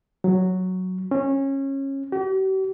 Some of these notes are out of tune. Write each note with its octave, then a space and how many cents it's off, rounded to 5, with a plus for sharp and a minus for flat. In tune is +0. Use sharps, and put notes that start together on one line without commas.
F#3 +0
C#4 -25
G4 -45